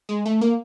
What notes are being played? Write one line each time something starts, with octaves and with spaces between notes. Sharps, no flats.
G#3
A3
A#3